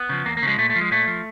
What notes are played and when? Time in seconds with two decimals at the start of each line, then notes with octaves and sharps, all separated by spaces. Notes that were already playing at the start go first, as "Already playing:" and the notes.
Already playing: B3
0.09 C#3 F3
0.25 E2 A#3
0.37 A#3
0.42 C#3 F3 G#3
0.58 A#2 A3
0.70 A3
0.76 F3
0.81 G#3
0.91 A#2 A3
1.07 F3